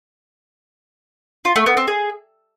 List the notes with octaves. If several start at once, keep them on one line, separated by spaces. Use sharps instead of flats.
F4
A3
B3
C4
G#4